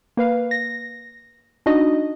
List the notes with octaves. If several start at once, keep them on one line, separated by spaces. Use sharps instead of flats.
A#3 B4 F5
A#6
D4 D#4 F#4 D#5